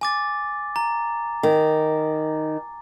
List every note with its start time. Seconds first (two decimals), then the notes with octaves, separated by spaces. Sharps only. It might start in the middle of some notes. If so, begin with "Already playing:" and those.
0.01 G#5 D6 A6
0.76 A#5
1.43 D#3